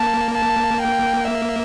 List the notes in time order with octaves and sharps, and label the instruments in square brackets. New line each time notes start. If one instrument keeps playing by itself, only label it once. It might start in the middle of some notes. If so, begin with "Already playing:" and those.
Already playing: [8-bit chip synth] A#3 [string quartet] A5
[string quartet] A5
G5
E5